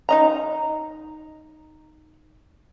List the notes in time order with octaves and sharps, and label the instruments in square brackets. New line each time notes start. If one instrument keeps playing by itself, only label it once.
[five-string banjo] D#4 D#5 A#5